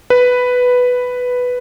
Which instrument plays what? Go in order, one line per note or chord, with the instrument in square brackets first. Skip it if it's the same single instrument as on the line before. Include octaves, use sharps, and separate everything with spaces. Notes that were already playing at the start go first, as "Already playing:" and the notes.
[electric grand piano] B4